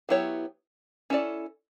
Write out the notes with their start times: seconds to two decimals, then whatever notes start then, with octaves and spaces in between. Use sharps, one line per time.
0.09 F#3 B3 E4 G4 C#5
1.10 C#4 E4 A4 D5